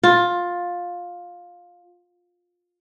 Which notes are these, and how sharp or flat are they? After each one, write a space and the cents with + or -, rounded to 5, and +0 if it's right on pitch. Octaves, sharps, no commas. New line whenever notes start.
F4 +15